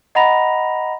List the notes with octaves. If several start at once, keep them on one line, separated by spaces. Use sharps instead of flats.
D#5 F#5 A#5 B5 A#6 F7